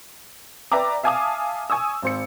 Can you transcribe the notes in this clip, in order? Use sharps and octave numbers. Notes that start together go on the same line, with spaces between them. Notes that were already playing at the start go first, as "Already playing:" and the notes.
B4 D5 E5 G5 A#5 D6
E5 F5 G#5 A5 D6 D#6
G#5 C#6 D#6 E6
G#1 C5 C#7